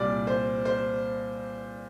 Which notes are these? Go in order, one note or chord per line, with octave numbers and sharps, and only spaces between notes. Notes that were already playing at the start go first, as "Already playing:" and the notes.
Already playing: C2 A#2 G3 D5
C5
C5